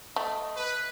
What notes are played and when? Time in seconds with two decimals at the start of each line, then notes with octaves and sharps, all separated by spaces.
0.16 A3 D#5
0.56 B4